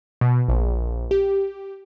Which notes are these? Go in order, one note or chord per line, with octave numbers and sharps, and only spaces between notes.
B2
A#1
G4